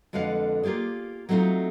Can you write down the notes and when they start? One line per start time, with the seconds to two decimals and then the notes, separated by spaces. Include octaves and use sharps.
0.13 F2 D3 G#3 B4 F5 F#5
0.63 A#3 F4 G4 G#4 D5
1.29 F#3 A3 C4 D#4 F4